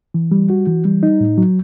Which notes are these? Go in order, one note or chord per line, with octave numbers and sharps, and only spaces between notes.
E3
G3
F#4
E3
G3
D#4
A2
F#3